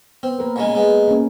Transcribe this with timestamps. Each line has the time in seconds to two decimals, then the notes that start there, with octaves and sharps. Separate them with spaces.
0.23 B3 C4
0.39 A#3 A#4 B4
0.56 A#2 C#3 G#3
0.75 G#3 B3
1.08 A#3 C#4